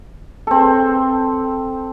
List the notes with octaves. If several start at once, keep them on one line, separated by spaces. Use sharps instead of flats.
C4 A4